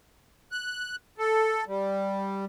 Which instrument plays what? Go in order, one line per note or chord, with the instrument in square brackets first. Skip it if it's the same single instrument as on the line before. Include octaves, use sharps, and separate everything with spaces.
[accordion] F#6
A4
G3